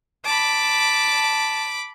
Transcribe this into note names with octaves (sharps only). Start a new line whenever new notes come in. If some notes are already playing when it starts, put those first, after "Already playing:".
A5 B5 D6